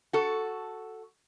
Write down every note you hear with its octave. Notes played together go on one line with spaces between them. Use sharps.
F#4 A4